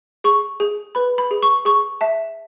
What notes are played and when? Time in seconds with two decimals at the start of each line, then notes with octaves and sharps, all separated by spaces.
0.24 G#4 C#6
0.60 G#4
0.95 B4 B5
1.18 B5
1.31 G#4
1.43 C#6
1.65 G#4 C#6
2.01 E5 A5